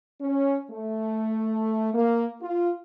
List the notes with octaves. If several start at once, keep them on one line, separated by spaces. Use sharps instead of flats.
C#4
A3
A#3
F4